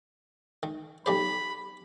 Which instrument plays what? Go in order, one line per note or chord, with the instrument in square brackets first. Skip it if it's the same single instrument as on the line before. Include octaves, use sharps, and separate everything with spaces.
[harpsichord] D#3
[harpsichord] B1 G4 C5 [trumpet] B5